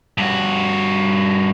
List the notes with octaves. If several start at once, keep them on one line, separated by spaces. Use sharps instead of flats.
G2 F#4